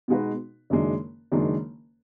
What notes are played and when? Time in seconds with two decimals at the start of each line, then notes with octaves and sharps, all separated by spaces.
0.08 B2 G#3 D#4 F#4 B4
0.70 F#1 F#2 D#3 G#3 D4
1.32 F#1 F#2 D#3 G#3 D4